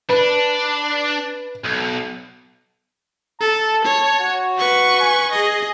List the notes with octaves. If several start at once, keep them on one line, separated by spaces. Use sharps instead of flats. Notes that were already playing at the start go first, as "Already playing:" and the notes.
D4 B4
B1
A4 A5
C#5
F#4
B4 C#6
G#5
G#4 D#5